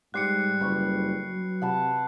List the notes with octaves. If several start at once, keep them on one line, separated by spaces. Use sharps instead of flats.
G#2 G3 G5 C6 D6 F#6 C7 C#7
F#1 B4 C#6
F#3
C3 F#5 A5 B5